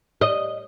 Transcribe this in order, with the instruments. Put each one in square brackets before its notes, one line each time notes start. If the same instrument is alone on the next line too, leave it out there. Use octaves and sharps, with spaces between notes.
[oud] D#5